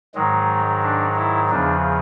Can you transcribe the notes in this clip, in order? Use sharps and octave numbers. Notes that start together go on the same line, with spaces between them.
G#2 D#3 F#3 G#3
D4
E4
E2 C#3 F3 D4